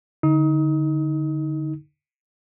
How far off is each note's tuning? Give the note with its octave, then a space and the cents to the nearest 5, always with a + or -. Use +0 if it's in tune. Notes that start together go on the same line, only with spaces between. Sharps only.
D3 +0 D#4 +20 D#6 +35